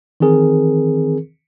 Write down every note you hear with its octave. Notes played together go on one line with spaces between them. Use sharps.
D#3 E3 C4 G#4 A#4